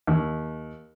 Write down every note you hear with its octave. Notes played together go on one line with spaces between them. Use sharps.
D#2